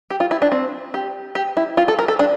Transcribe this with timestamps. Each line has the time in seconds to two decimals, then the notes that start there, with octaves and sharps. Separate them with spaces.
0.10 G4
0.20 F4
0.31 E4
0.42 D4
0.52 C4
0.94 G4
1.35 G4
1.57 E4
1.77 F4
1.88 A4
1.99 A#4
2.08 A4
2.19 D4